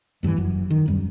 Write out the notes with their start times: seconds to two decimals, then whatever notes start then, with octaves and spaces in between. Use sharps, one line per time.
0.23 E2 G2 D3 E3
0.37 F#1 F#2
0.70 D#3
0.86 D#1 F#2 G3